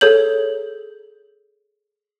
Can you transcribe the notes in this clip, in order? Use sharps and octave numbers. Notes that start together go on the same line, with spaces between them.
G#4 A4 C#5 G6 F#7